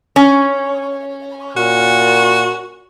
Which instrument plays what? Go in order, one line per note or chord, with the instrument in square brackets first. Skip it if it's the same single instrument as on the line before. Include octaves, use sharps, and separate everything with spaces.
[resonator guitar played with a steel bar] C#4
[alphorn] A#2 [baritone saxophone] F#4